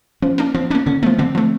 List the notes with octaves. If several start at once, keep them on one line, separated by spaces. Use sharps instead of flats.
F3 C#4
A#3 D4
F3 C4
A#3 C#4 D4
D3 C#4
F3 A3 B3
D3 C4
F3 A3